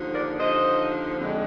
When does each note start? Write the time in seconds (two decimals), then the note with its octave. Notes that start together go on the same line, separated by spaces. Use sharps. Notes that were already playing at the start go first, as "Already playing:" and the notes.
Already playing: D#2 D3 F3
0.13 A#4 D5
0.39 D#2 D3 F3 C5 D#5
1.19 F2 D3 G#3